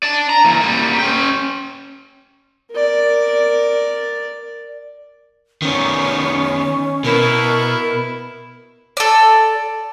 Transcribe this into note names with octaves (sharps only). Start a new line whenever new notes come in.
D5 A5
A#5
E3 A#3
G3 A#3
C#4 G5
A#4 D5
D#3 B3 C#4
B2 B3 E4 A#4
A4 D5